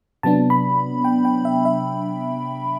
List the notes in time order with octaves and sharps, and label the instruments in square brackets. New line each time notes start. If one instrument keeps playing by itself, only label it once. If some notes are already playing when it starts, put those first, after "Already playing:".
[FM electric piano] C3 F#3 B3 D4 A5
B5
G5
G5
E5
E5